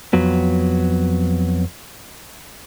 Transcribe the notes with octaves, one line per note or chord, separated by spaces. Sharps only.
F2 F#3 B3